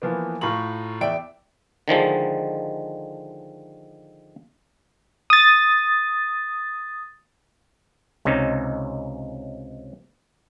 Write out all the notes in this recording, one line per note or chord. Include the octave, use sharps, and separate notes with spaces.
E3 F3 A#3 B3
A2 F4 A#5 C#6 F#7
E2 D5 E5 G5 D7
D3 D#3 F3 G#3
D#6 A6
C#2 C3 C#4 D#4